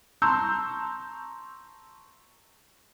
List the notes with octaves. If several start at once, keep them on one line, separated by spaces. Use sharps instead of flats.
A5 A#5 C6 C#6 E6 G6